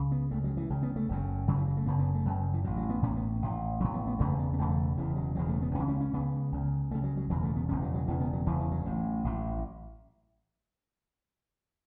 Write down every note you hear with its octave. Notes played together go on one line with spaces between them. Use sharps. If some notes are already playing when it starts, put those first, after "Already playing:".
Already playing: C#2 C#3
B3
C#2 C#3 A3
F#3
E3
C#2 C#3
B3
A3
F#1 F#2 C#3
F#1 F#2 C#3 F#3
E3
F#3
A3
F#1 F#2 C#3 B3
B3
A3
F#1 F#2 C#3 F#3
E3
A1 A2 F#3
F#3
B3
A1 A2 C#4
B3
A1 A2
A1 A2 F#3
B3
B3
E1 E2 C#3 A3
B3
B3
E1 E2 C#3 A3
E1 E2 C#3 E3
F#3
E1 E2 C#3 F#3
A3
B3
C#2 C#3 C#4
C#4
C#4
C#2 C#3 B3
C#2 C#3
C#2 C#3 A3
F#3
F#3
E1 E2 C#3 F#3
A3
B3
E1 E2 C#3 C#4
F#3
F#3
E1 E2 C#3 E3
B3
F#3
E1 E2 C#3 E3
E3
F#3
A1 A2
A1 A2